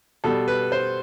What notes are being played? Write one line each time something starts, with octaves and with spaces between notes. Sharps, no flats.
B2 G3 A4
B4
C5